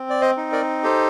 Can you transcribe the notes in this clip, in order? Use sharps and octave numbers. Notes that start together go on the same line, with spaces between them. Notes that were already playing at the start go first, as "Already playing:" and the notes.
Already playing: C4
D5
C5 D#5
D#4
A#4 D5
G4 A4 C5